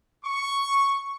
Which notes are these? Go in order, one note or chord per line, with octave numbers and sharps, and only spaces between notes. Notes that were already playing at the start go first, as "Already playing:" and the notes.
C#6